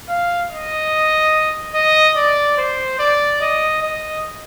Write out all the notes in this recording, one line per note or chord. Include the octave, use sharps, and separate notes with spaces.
F5
D#5
D#5
D5
C5
D5
D#5
D#5